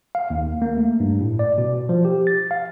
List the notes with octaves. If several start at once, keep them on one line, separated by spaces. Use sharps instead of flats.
F5
D#2
A#3
A3
G2
A2
D5
B2
F3
G4
A6
F5